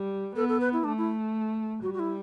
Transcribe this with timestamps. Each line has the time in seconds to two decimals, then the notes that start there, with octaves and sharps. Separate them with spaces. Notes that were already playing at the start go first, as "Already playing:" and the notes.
Already playing: G3
0.36 B3 A4
0.49 A4
0.60 B4
0.73 E4
0.84 A3 D4
0.98 E4
1.82 G3 F#4
1.94 F#4
1.99 E4